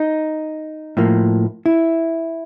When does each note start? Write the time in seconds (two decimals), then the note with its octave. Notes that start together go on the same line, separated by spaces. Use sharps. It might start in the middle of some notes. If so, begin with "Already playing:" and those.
Already playing: D#4
0.97 A2 F3 A#3
1.66 E4